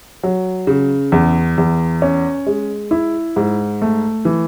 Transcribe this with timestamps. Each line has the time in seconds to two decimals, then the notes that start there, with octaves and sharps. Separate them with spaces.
0.23 F#3
0.67 C#3
1.12 E2
1.58 E2
2.02 C#4
2.47 G#3
2.91 E4
3.36 G#2
3.82 A3
4.25 E3